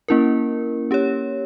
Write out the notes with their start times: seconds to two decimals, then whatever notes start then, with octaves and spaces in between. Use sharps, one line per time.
0.08 A#3 C#4 E4 A#4
0.91 C#4 G4 C#5